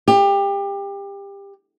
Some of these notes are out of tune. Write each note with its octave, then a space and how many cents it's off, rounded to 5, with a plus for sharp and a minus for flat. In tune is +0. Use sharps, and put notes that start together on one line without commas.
G4 +25